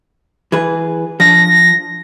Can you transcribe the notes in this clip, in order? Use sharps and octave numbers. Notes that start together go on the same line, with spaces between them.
E3 G#4 B4
F3 D4 A#6